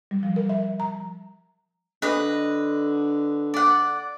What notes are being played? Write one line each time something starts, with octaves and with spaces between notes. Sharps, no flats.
G3
F3
A#4
E5
A#5
D3 B4 D#5
D5 F#5